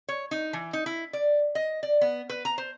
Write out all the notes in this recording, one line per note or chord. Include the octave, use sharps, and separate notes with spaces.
C#5
D#4
E3
D#4
E4
D5
D#5
D5
B3
B4
A#5
C5